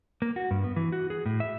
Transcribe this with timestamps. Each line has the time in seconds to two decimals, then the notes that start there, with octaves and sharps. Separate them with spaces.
0.22 A#3
0.36 F#4
0.51 G2
0.64 B3
0.76 E3
0.92 F#4
1.10 G#4
1.26 A2
1.40 E5